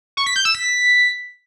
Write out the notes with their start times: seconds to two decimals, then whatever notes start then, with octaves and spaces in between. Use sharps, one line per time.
0.17 C#6
0.26 B6
0.36 G6
0.45 E6
0.55 B6